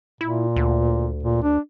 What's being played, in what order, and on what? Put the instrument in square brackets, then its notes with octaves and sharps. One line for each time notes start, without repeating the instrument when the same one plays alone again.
[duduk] A#2 [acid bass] E4
[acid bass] D2
[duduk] A#2
D4